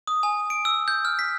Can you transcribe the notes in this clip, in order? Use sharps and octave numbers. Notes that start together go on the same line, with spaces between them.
D#6
G#5
D7
E6
G6
F6
B6